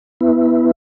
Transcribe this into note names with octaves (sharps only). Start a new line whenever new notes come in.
B3 E4